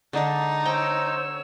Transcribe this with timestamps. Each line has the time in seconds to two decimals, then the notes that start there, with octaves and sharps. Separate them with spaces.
0.13 D3 G#3 D4 D#4
0.65 C5 C#5 G5 A#5 E6